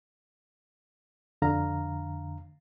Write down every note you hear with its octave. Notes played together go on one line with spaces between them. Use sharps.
F2 D3 F5 A#5